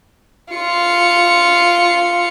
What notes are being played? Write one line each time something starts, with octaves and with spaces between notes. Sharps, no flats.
F4 C#7